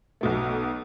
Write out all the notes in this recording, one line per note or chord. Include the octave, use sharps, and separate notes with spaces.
B1 B2 A3